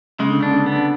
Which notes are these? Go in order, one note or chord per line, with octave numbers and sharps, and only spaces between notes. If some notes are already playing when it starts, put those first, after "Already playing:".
C#3 G#3
D3
C#3 D4
D3
C#3 B3
D3